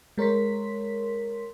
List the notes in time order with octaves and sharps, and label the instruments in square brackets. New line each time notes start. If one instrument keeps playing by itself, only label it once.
[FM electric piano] G#3 A#4 C#5 C6 B6